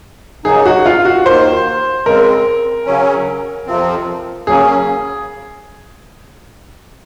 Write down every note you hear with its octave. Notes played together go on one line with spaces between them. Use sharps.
C#3 F#3 A#3 D#4 G#4
F#4
F4
F#4
D#2 D#3 A#3 C5
C#3 G#3 C4 A#4
C#3 F#3 C#4
F2 C3 F3 C4
C#3 F#3 A#3 C#4 G#4